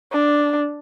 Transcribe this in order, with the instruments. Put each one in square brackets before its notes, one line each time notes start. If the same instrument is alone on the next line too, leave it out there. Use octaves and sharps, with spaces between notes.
[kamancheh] D4